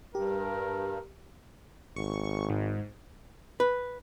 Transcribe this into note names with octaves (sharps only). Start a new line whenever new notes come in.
G2 G4 A#4
G#1 C#6
G#2
B4